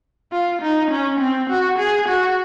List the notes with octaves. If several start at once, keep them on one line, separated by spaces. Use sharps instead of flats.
F4
D#4
C#4
C4
F#4
G#4
F#4